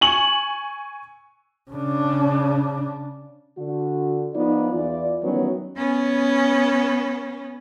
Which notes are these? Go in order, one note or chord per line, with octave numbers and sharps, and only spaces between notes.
G#5 C#6 F#7
C#3 D4
D3 F#4
F3 B3 D#4 F4 D5
E2 E3 F4 D5
D#3 E3 F#3 G3 B3 C#4
B3 C#4